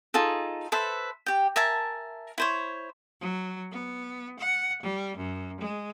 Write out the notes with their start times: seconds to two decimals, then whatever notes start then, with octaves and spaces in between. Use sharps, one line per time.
0.14 D#4 F4 G#4 A4
0.72 A4 B4 C5 E5
1.26 G4 G5
1.56 A#4 E5 G#5 A5
2.38 E4 C5 C#5
3.20 F#3
3.70 B3
4.38 F#5
4.82 G3
5.16 F#2
5.59 G#3